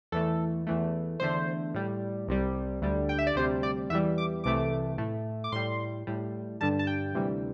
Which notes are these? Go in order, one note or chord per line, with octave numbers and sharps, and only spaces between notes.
E2 E3 A3 A4
E2 E3 A3
E2 D3 A3 C5
A2 G3
C2 C3 G3
D2 D3 G3
G5
E5
D5
D2 C3 G3 C5
D5
E2 E3 G3 E5
D6
C2 C3 E3 A3 D6
A2 A3
D6
A2 G3 C6
A2 G3
G2 D3 G3 A5
A5
G5
D2 C3 E3 G3